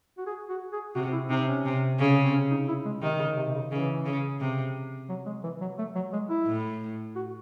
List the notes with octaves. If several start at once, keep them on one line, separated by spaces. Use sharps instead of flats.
F#4
G#4
F#4
G#4
C3 F#4
E4
C3 D#4
C#4
C3
C#3
C4
C#4
D#4
E4
G#3
C3 D#3
C#3
C3
C3
C#3
C#3 E3
C#3
C3
F#3
G#3
E3
F#3
A3
F#3
G#3
E4
A2
F#4